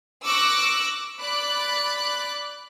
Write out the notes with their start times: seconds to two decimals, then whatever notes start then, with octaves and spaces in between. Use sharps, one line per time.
0.25 C#6 D6 E6 F#6 A#6
1.20 D5 B5 D6 F#6